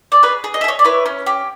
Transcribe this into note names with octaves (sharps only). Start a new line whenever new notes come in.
D5
G#4 B4 C#5
G#4
D#5
E5
G#4
C#5 D#5
D5
E4 B4 C#5
C#4
G4